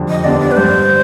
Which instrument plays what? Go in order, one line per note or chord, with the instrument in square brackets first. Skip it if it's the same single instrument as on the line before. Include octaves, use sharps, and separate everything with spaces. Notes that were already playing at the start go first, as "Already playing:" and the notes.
Already playing: [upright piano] F2 D3 G3 D4
[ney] D#5
[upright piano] D3 G3 B3 D4 [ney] D5
[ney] D5
B4
[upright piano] G2 [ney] C5